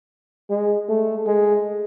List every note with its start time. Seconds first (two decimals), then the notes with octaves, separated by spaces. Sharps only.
0.50 G#3
0.89 A3
1.27 G#3